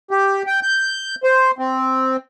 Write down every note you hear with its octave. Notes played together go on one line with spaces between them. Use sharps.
G4
G5
G6
C5
C4